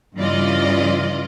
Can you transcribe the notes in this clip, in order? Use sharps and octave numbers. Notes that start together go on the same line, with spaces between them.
G2 C#3 E3 F4 D5 D#5